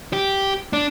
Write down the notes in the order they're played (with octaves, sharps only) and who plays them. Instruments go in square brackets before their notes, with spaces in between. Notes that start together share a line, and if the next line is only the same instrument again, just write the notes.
[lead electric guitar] G4
D4